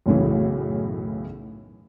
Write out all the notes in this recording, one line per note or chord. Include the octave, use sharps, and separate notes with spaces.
B1 F#2 A2 C#3 E3